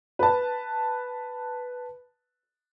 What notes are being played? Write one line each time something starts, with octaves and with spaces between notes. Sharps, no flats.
B4 A5